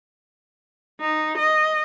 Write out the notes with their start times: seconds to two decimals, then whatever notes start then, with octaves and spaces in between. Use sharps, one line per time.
1.01 D#4
1.38 D#5